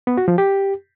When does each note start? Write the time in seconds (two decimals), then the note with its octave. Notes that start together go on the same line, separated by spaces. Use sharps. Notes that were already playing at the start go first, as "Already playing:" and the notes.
0.07 B3
0.17 F#4
0.28 F3
0.38 G4